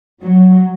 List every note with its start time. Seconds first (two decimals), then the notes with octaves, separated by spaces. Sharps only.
0.22 F#3